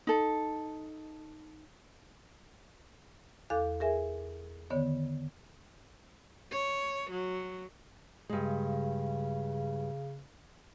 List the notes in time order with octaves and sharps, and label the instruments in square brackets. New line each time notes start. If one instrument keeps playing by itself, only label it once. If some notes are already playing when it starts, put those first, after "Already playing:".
[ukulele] D#4 A4
[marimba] E2 A4 F5 D6 F#6
G#4 A#4 E5 G#5
D3 D#3 B3 C#5
[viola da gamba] C#5
F#3
[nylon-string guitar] G2 G#3 [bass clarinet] C#3